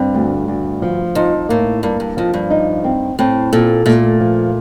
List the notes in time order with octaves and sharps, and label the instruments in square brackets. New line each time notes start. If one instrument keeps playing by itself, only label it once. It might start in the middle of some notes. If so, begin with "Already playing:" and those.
Already playing: [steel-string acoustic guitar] G2 [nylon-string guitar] C4
[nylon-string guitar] D2
D2
F3
[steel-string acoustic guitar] F2 [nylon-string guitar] D#4
[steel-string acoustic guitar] A2 [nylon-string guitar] A#3
[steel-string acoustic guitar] G2 [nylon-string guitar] A#3
[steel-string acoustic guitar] G2
[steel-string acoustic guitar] F2 [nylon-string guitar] F3
[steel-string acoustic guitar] G2
[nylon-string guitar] D#4
C4
[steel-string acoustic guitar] A2 [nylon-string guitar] C4
[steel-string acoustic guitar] A#2 [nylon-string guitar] A4
[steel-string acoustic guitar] A#2 [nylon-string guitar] A3
[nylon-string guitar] F3